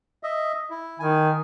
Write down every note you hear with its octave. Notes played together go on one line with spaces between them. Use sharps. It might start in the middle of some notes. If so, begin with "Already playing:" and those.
D#5 E5
E4
D#3 G#5